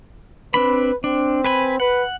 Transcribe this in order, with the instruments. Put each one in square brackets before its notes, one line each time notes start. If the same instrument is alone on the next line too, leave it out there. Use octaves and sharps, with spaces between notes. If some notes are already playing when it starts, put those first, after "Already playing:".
[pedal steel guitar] C4 D4 B5 [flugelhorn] B4
[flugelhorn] C4 [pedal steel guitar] D4
[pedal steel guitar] B4 G#5 B5
[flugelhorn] B4 [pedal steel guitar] F#5